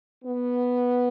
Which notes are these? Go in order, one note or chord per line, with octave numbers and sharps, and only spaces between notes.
B3